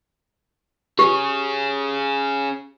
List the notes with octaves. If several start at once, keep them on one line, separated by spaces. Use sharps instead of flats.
C#4 G4 G#4